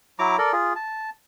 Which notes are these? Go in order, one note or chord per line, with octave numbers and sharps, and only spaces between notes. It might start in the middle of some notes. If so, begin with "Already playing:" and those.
F#3 E4 A#5 D6
A4 A#4 D5
F4 G#4
A5